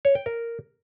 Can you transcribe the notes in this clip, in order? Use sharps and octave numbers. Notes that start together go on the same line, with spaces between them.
C#5
G5
A#4